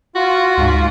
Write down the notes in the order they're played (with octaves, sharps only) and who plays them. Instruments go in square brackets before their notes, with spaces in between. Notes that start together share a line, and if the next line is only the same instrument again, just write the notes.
[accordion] F4 [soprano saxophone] F#4
[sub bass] D2 [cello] G#2